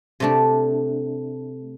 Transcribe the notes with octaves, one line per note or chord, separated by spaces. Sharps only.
C3 A3 D4